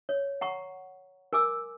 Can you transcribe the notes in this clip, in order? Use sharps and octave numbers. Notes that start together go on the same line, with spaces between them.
C#5
F#5 A#5 C#6
A#4 G#5 D6 E6